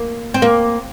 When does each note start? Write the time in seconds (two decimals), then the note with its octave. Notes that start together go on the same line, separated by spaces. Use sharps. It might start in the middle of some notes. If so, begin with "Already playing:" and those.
Already playing: A#3
0.34 C4
0.42 A#3